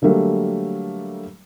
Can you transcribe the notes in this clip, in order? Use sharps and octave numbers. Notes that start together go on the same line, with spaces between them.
D3 F#3 G3 A3 A#3